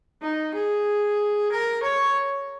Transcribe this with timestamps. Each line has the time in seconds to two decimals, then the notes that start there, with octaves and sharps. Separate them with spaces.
0.22 D#4
0.54 G#4
1.51 A#4
1.82 C#5